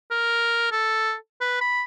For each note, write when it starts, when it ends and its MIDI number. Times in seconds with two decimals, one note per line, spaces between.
0.11 0.67 70
0.72 1.15 69
1.41 1.57 71
1.61 1.84 83